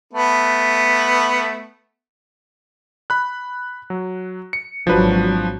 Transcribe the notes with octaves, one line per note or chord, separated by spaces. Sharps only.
A3 B3
B5 F#6
F#3
C#7
G#1 F3 F#3 D4 B4